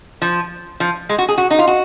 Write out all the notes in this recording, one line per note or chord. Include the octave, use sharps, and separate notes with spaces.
F3
F3
G#3
F#4
G#4
F#4
D#4
F4
F#4